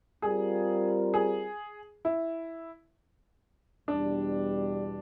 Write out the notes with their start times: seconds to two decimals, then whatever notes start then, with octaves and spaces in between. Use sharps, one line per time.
0.22 G3 C4 F4 G#4 A#4
1.14 G#4
2.05 E4
3.88 E2 B2 G3 D4